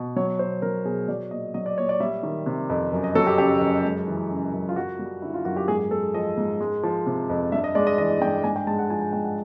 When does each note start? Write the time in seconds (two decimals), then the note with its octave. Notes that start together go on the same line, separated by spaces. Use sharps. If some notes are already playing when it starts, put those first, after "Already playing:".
Already playing: B2
0.16 F#3 C#5
0.39 B2 C5
0.62 F#3 A#4
0.85 B2 G#4
1.08 F#3 D5
1.31 A#2 D#5
1.54 F#3 D#5
1.66 D5
1.78 A#2 C#5
1.89 D5
2.00 G3 E5
2.23 D#3
2.46 C3
2.70 F2
2.93 F#2
3.04 D#5
3.15 F#3 A4
3.27 G4
3.38 C#3 G4
3.61 F#2
3.85 G#3
4.07 E3
4.30 C#3
4.53 F#2
4.69 F4
4.76 F#2 F#4
4.99 G3
5.22 D3 E4
5.34 F4
5.45 F#2 F#4
5.56 G4
5.68 G#2 G#4
5.91 G#3 A4
6.14 F3 D#5
6.37 G#2
6.61 G#3
6.83 F3
7.06 C3
7.29 F2
7.52 G2 E5
7.64 D#5
7.75 G#3 D5
7.87 D#5
7.98 E3 D#5
8.21 G2 G5
8.44 G#2 G#5
8.56 G5
8.67 G#3 A5
8.79 F#5
8.90 F3 G#5
9.01 G#5
9.13 G#2 G5
9.24 F#5